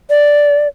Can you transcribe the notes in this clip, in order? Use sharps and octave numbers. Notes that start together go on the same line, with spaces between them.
D5